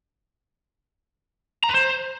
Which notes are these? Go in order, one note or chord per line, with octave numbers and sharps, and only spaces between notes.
A#5
B4
C5